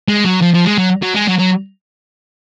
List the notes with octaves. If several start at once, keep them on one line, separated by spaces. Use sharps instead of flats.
G#3
F#3
F3
F3
G#3
F#3
F#3
G#3
F#3
F#3